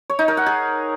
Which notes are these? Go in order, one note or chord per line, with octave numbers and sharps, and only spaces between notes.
C#5
D#4
A#4
F#5
G#4